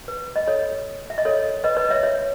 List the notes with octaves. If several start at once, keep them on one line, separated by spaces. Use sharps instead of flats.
B4
D#5
A4 C#5
E5
D#5
A4 C#5
B4 D#5
B4 D#5
C#5 E5
C#5 E5